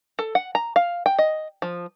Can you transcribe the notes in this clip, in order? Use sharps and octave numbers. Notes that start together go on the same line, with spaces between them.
A4
F#5
A#5
F5
G5
D#5
F3